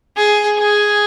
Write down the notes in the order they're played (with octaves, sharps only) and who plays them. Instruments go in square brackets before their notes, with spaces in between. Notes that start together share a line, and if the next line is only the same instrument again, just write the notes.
[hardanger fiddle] G#4
G#4